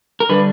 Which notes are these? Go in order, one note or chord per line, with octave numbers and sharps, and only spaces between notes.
A#4
D3 G3 D4 B4